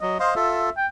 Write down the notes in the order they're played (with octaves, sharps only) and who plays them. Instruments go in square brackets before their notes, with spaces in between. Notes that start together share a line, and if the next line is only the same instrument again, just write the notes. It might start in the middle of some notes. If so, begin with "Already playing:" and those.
[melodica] F#3 [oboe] D#5
[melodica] C5 D#5 F5 [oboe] C6
[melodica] F4 A4 [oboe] E5
[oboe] G5